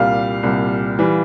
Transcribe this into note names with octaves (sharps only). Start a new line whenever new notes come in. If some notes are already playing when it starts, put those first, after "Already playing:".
Already playing: C2 A#2 G3 F5
C2 A#2 G3
E3 G3